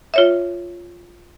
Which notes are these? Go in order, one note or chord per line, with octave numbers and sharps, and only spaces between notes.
F4 C#5 E5